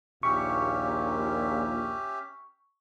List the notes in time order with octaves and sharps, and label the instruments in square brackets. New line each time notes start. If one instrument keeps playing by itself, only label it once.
[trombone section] A#1 D#2 A#2 [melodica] C#4 G4 E5 [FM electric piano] C#6